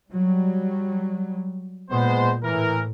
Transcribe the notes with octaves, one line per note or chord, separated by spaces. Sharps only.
F#3 G3
A#2 G#3 B3 C5
A2 E3 A#4